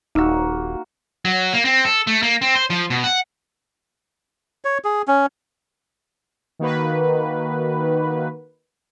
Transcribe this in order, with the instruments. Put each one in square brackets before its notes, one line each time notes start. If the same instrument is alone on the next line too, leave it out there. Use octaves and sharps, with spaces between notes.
[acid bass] D#1 [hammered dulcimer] A#3 F#4 [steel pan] D#4 E6
[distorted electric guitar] F#3
A#3
C4
A4
A3
A#3
C4
C5
F3
B2
F#5
[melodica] C#5
G#4
C#4
[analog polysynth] D#3 A#3 F#4 B4